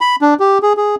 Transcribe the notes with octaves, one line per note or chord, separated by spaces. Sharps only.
B5
D4
G4
G#4
G#4